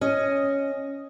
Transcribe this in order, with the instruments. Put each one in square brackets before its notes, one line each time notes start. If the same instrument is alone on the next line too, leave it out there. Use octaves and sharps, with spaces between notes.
[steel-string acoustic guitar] C#4 D#5